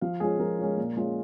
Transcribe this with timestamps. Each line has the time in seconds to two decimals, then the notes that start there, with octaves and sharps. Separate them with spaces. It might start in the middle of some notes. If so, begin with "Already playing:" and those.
0.01 F3 F5
0.20 G#3 C#4 F4 G#4
0.39 F3 A#4
0.59 G#3 C#4 F4
0.77 A#2
0.97 G#3 C#4 F4